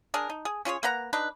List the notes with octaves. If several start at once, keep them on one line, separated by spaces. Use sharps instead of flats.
D4 G#4 A#4
D#4
G#4
C#4 F4 G#4 C#5
A#3 B4 F#5 A#5
D4 D#4 B4